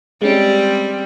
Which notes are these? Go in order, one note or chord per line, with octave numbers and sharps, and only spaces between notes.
G3 G#3 C4 C#4